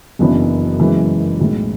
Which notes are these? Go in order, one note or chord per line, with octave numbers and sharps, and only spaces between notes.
F#1 F#2 E3 B3 D4
F#1 F#2 E3 G#3 C#4
B1 A2 E3 G#3